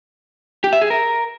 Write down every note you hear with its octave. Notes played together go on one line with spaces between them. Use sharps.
G4
E5
G#4
A#4